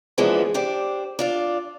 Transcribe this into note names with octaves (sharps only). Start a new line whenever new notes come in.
E3 F3 G#3 A#3 B3 D4
D4 G4 C5
D4 F4 D5